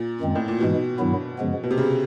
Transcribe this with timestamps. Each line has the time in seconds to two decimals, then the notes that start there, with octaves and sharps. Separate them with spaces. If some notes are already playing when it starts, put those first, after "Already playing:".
Already playing: A#2
0.20 F#2 D#3 G#3 C4
0.35 A2
0.48 A#2
0.60 G#2 B2 E3 G#3
0.99 G2 D#3 F#3 B3 E4
1.39 F#2 C#3 F3 G#3 B3
1.64 B2
1.71 C3
1.78 C#3